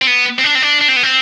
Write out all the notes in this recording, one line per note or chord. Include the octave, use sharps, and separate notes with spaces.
C4
B3
C4
D4
C4
D4
D4
C4
B3
C4